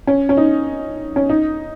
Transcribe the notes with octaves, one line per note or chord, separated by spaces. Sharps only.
C#4
C#4
D#4
C#4
D#4